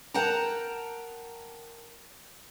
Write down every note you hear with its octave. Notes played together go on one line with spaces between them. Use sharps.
A#4 F#5 G5 A5 A#5